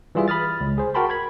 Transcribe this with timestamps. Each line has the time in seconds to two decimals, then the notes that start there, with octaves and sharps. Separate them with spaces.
0.15 E3 G3 F4 G#4 E5
0.28 B5 D#6 F6 A6
0.61 C#2
0.78 G#4 C5
0.94 F#4 A#4 G5 A5 B5 C6
1.10 B5 G#6